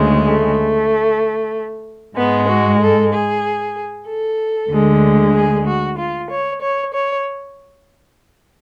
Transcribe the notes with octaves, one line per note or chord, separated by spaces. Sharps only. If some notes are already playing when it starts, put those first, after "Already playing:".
Already playing: D2 C#3 G#3
A3
G#2 G#3 B3
F#4
A4
G#4
A4
D2 D3 G#3
G#4
F#4
F4
C#5
C#5
C#5